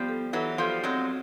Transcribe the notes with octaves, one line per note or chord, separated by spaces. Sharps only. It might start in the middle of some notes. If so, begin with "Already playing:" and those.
Already playing: F3 G3 B3
A4
E3 F#3 A4
F3 G3 A4
F#3 G#3 C4